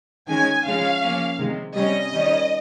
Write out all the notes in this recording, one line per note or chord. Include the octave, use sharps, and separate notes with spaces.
D#3 G#3 C#4 G#5
C#3 F3 G#3 C#4 F5
F3 A#3 C#4
C3 D#3 G#3
C3 G3 C#4 D#5
D#3 G3 C#4